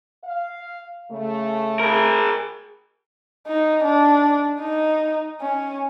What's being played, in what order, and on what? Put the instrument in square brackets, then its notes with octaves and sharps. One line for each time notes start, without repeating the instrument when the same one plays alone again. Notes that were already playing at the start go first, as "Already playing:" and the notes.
[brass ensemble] F5
C#3 A3
[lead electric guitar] G#4 A#4
[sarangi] D#4
D4
D#4
C#4